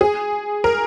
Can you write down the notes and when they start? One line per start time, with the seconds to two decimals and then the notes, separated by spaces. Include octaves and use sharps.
0.01 G#4
0.64 A#4